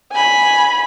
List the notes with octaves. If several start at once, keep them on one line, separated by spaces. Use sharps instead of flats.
G#5 B5